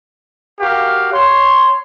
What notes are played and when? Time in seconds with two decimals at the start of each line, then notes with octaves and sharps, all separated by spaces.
0.60 F#4 G4 A#4 F5
1.13 C#5 C6